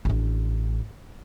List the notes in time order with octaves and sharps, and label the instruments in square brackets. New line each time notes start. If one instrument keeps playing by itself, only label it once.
[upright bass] A1 D4